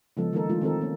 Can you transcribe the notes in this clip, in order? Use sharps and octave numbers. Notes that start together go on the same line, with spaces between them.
C#3 F3 G#3 B3 A4
D#3 G#3 A#3 D#4 A4 A#4
E3 G#3 A3 D4 D#4 F4
D#3 C4 A4 A#4
A#3 C#4